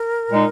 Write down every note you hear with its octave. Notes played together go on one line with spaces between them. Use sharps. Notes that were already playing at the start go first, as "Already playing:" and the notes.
Already playing: A#4
A#2 G#3 D#4